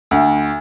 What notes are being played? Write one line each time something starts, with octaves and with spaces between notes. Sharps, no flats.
D2